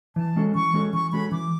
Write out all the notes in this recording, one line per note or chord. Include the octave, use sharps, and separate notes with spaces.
E3 A5
G#3 C#4 F#4 A4
E3 C#6
G#3 C#4 F#4 A4
E3 C#6
G#3 C#4 F#4 A4 B5
E3 D6